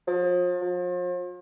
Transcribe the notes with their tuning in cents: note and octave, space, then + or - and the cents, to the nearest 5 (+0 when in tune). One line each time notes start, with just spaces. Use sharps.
F3 +40
F3 +40